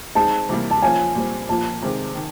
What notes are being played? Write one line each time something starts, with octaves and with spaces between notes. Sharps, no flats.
G#3 C4 D#4 A5
C3 E3 G3 A#3
A5
F3 A#3 C#4 F4 G#5
A#2 G3 C4
A#2 F3 A#3 A5
C3 D#3 G#3 C4
D#3